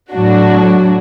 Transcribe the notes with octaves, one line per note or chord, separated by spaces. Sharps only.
A2 F#3 D4 F#4